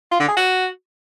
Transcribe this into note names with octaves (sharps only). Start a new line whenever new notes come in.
F4
D3
G#4
F#4